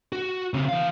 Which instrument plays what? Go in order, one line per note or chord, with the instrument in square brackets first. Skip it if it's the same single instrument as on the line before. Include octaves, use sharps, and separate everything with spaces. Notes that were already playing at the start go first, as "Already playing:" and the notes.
[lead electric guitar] F#4
C#3 C4
E3 F5